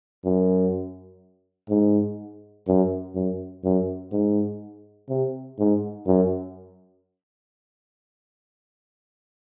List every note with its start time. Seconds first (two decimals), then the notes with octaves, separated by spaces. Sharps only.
0.25 F#2
1.69 G#2
2.67 F#2
3.15 F#2
3.64 F#2
4.12 G#2
5.09 C3
5.59 G#2
6.07 F#2